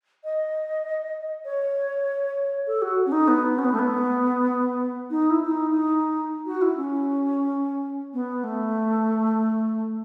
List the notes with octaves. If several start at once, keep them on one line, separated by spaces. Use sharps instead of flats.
D#5
C#5
A4
F#4
C#4
D#4
B3
C#4
B3
A3
B3
D#4
E4
E4
D#4
D#4
F#4
E4
C#4
B3
A3